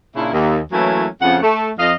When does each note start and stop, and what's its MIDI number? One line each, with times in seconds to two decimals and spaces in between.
0.15 0.29 46
0.15 0.29 49
0.15 0.29 62
0.15 0.29 64
0.32 0.59 39
0.72 1.06 52
0.72 1.06 54
0.72 1.06 57
0.72 1.06 58
0.72 1.06 61
0.72 1.06 64
1.21 1.37 41
1.21 1.37 49
1.21 1.37 78
1.42 1.70 57
1.78 1.93 41
1.78 1.93 75
1.78 1.93 77